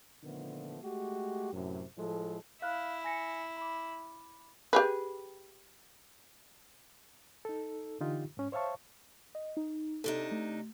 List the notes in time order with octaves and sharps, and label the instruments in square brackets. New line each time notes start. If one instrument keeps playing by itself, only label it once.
[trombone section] A#2 D3 D#3 F3 A3 B3
G#3 A3 F#4 G4
F#2 A2 C3
A2 F3 G#3 A3 A4
[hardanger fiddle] E4 [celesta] F5 F6 F#6
[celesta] G#5 A#6 C#7
B5 D6
[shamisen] G4 G#4 B4
[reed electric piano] D#4 A4
D3 E3 D#4 F4 G4
G#2 C#4
C5 C#5 E5 F5 A5 C#6
[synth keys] D#5
D#4
[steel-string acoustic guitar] C3 D4 D#4 [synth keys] A4
[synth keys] A3